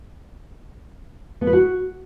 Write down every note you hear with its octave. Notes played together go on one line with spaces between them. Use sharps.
B3
B4
F#4